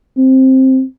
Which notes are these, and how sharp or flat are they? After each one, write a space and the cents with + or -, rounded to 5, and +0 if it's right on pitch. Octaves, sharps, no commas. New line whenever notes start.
C4 +10